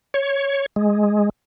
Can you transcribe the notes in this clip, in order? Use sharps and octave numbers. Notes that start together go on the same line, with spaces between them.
C#5
G#3